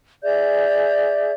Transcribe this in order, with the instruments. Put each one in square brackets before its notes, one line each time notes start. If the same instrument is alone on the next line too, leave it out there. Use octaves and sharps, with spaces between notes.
[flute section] G#4 D5 E5 G6